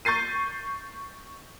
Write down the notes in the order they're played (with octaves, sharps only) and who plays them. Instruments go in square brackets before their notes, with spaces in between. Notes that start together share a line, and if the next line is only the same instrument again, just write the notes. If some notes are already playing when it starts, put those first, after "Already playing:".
[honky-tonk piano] C#6 G6 A6 C7 D#7